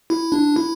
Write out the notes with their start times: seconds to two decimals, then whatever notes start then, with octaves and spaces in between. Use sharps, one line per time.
0.10 E4
0.32 D4
0.56 E4